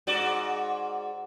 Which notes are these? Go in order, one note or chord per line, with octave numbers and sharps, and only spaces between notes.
G#2 F#4 D5